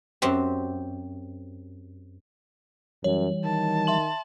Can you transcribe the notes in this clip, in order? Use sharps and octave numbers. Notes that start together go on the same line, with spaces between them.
F#2 C4 G4
F#2 E3 G3 C#5
D#3 A5
E5 C6 F#7